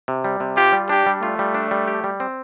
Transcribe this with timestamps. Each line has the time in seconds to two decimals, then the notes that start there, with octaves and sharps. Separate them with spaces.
0.08 C3
0.25 G3
0.40 C3
0.57 F4 G4
0.73 G3
0.89 D4 G4
1.06 G3
1.22 A3 F4
1.39 G3
1.54 D4
1.71 G3
1.88 G4
2.04 G3
2.20 C4